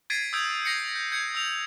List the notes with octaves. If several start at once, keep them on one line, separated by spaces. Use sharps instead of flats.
G#6 A6 B6 C7 D7 D#7
D#6 E6 G6 G#6 D7
G#6 A#6 C7 C#7
G6
G6 G#6 C#7
E6 F7